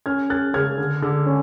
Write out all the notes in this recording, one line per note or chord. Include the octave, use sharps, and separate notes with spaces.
C#4 F6 G#6
C#4 F#6 A6
C#3 F6 G#6
D3
D3
C#4